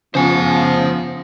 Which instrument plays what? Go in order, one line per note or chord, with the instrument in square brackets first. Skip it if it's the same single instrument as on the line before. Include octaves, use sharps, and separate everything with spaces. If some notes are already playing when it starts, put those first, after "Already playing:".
[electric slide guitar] C#3 [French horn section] F3 [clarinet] B3 [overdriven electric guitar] C5 G#5